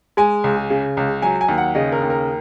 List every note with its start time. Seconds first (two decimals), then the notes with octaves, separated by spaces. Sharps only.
0.17 G#3 G#5
0.44 C#2
0.70 C#3
0.97 C#2
1.22 F#3 G#5
1.41 G#5
1.48 D#2
1.58 F#5
1.75 C#3 D#5
1.92 A#4
2.02 D#2
2.10 A#4